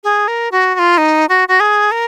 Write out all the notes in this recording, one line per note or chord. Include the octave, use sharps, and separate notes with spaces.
G#4
A#4
F#4
F#4
F4
D#4
F#4
F#4
G#4
A#4